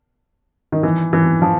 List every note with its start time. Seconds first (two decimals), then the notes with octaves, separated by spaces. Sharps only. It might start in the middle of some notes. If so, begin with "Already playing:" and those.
0.72 D#3
0.83 E3
1.13 E3
1.42 F3